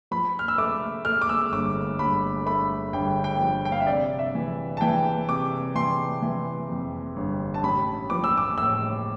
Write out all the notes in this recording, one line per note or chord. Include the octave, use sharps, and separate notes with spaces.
F3 B5
F6
E6
A3 D6
A3 F6
D6
E6
G1 D6
G1 B5
A3 B5
G1 G5
G5
F3
G5
F5
E5
C3 D5
E5
E3
A5
E3 G5
C3 D6
E3 C6
E3
F2
G1
A5
A1 B5
F3 D6
E6
D6
A2 E6